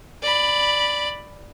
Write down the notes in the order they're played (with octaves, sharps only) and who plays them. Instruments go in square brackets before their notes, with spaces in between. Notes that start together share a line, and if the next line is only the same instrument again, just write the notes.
[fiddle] D5 B5